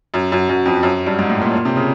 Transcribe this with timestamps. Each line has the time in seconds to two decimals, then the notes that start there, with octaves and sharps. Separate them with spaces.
0.14 F#2
0.32 F#2
0.49 F#2
0.65 F2
0.83 F#2
1.06 G2
1.19 G#2
1.30 A2
1.41 A#2
1.53 A#2
1.65 C3
1.76 C#3